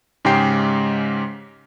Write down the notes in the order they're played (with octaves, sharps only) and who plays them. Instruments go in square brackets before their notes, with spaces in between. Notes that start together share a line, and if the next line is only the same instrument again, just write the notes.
[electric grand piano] G#2 C#3 G#3 G4 G5 C7